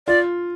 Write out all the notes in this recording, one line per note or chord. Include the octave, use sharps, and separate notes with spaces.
F4 D5